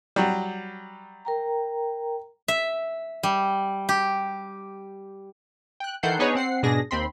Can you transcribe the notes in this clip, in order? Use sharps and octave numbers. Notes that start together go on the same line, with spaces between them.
F#3 G3
A#4 G5 A#5
E5
G3
G4
G5 F#6
D#3 E3 A4 F#5 G6 C7
B3 D4 D#4 G#4 B4 C#5
C4 F#5 C7
G#2 B2 D4 G#4 A#6
D#2 C4 B5 C6